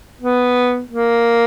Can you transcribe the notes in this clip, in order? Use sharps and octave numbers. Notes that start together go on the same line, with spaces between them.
B3
A#3